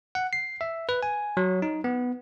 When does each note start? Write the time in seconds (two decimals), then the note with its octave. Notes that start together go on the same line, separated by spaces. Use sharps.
0.15 F#5
0.33 C7
0.61 E5
0.89 B4
1.03 G#5
1.37 F#3
1.62 D#4
1.84 B3